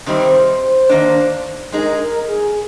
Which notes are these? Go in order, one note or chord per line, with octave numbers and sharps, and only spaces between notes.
C3 D#3 G3 C4 C5
D#3 A#3 D4
G#3 D#4 G#4 A#4
A#4
G#4